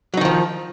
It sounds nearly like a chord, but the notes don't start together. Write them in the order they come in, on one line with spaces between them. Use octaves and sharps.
F#3 D#4 D#3 F3